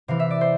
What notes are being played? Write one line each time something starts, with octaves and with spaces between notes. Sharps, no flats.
C3 E3 F5
E5
D5
C5